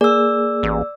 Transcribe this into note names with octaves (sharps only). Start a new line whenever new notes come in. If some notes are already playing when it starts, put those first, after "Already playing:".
A#3 G#4 D5 E6
A1